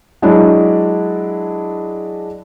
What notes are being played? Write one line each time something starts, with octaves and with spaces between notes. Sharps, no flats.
F#3 G#3 D4 E4